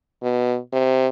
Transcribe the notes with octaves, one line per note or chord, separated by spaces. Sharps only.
B2
C3